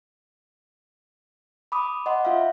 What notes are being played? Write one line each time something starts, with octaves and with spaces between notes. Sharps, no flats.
B5 D6 D#6
D#5 F#5 C6
F4 E5 F5